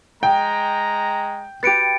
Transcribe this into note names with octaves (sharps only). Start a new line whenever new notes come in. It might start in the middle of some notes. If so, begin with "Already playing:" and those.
G#3 G5 A#5
G4 B4 A6 C#7 D7